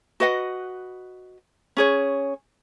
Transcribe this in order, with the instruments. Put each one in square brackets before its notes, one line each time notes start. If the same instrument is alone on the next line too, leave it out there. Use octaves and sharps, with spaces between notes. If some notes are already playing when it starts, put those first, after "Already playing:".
[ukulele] F#4 B4 D#5 F#5
C#4 G#4 C#5